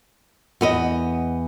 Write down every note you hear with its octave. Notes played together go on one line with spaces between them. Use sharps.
E2 B3 D#5